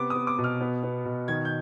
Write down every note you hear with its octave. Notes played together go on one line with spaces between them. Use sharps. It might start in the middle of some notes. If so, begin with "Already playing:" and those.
Already playing: C3 B3 D6
B3 D#6
D6
B2
F6
B3
B3
B2
D#3 G#6
G6